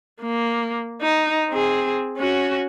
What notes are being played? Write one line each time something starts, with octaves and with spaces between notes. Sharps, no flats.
A#3
D#4
C4 G#4
C#4 F#4